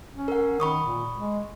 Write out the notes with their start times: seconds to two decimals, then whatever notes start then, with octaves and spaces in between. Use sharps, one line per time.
0.15 C#4
0.28 A#4 F#5
0.60 D#3 B5 C#6 D#6
0.84 A#2
1.17 G#3